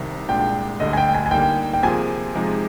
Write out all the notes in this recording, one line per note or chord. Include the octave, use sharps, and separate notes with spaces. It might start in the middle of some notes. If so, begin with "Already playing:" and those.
Already playing: C2 C3 D#3
C2 A#2 G#3 D4 G5
D2 D3 G3 D#5
G#5
G5
G#5
G#5
D3 G3 A#3 D#4 G5
G5
C3 F3 A#3 F4 G#4 G#5
C3 F3 G#3 D#4 G4